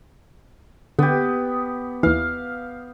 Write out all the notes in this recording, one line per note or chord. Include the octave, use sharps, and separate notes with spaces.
D3 B3 G4
D#2 E3 F5